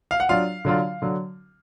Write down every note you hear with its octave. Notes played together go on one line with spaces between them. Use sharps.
F5
F#5
F#3 D4 F4 F5
D3 F#3 D4 F4
D3 F#3